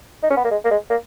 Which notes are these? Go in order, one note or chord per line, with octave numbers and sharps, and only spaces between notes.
D#4
C#4
B3
A#3
G#3
A#3
G#3
A#3